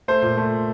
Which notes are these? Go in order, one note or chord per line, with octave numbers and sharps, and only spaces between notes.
A3 C5
A#2
A3